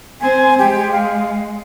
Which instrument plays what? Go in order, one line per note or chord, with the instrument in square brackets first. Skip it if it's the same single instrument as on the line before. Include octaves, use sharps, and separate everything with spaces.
[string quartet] C4 C5 [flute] G#5
[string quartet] G#3 [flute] G4
[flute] F5